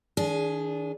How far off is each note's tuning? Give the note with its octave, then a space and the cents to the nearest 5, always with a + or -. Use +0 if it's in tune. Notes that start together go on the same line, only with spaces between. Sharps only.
D#3 +30 D4 -25 G#4 +0